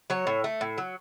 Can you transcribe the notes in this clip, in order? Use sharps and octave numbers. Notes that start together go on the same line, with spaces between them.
F#3 C#5
A2
A3
A2
F#3